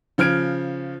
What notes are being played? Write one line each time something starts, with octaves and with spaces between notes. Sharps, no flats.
C#3 F3 F6 G#6 D7